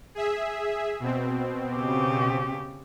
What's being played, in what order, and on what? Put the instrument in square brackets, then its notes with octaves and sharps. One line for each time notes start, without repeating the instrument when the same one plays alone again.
[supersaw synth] G#4 E5
B2 C4
[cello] C#3 G4